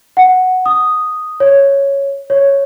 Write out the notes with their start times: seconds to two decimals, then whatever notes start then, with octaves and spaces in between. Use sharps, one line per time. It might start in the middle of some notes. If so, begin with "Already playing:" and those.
0.17 F#5
0.66 D#6
1.40 C#5
2.30 C#5